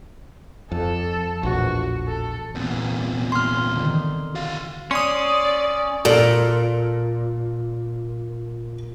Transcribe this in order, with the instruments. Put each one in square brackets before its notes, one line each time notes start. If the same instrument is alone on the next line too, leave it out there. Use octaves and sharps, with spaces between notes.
[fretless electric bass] F2 [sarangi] A4
[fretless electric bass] A#1 E2 A2 [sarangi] F#4
[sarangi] A4
[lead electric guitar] E2 A#2 [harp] B3 C4
[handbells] C6 F6
[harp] D3 D#3
[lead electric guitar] F#4 F5
[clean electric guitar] C#4 [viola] D5 [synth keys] C6 D#6
[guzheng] A#2 [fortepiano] A4 D5